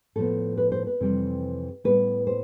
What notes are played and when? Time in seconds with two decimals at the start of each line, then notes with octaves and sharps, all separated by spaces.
0.16 A2 F3 B3 A4
0.58 B4
0.72 C5
0.87 B4
1.00 F2 C3 E3 G3 C4
1.84 A2 G3 B3 B4
2.27 C5